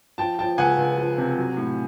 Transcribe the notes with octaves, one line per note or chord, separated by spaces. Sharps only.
F3 G5 A5
F3 G5 A5
C#2 F#5 G#5
C#2
F3
C3
F#3
A2